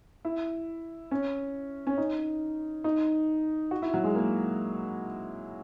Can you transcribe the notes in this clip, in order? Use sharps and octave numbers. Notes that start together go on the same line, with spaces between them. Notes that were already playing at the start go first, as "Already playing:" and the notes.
E4
C#4
C#4
D#4
D#4
F#4
E4
F#3
G#3
A#3